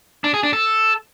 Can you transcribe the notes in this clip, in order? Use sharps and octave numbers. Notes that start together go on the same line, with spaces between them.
D4
G#4
D4
A4